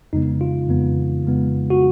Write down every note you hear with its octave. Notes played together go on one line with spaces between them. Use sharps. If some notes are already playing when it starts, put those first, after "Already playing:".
F2 C#3 G#3 B3 D#4
F4
F2 C#3 G#3 B3
F2 C#3 G#3 B3
F#4